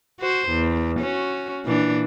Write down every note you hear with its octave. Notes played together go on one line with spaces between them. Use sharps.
F#4 C5
E2
C#4 F#4
A#2 E3 D4